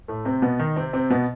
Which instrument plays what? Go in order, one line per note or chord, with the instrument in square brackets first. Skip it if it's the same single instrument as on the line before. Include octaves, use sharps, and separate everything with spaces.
[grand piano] A2 A3
C3 C4
B2 B3
D#3 D#4
C3 C4
C3 C4
B2 B3